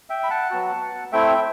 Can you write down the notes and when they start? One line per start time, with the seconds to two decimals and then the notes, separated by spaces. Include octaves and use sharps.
0.10 E5 G5
0.24 B5
0.30 F#5 A5
0.50 F#3 B3 F#4
1.12 A3 C4 E4 E5 G5